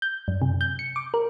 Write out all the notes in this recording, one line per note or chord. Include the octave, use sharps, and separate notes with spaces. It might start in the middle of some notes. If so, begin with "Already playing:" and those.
G6
F#2
C3
G6
C#7
D6
A#4